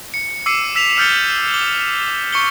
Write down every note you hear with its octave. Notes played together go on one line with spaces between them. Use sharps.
C#7
D6 E6 C7 C#7 D#7
E6 B6 E7 F7
E6 F6 G6 A6 C#7 G7
D6 G7
C#6 C#7 G7